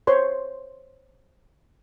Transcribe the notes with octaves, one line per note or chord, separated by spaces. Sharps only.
C5 C#5 C6